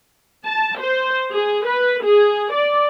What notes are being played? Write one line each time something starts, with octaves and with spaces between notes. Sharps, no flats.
A5
C5
G#4
B4
G#4
D5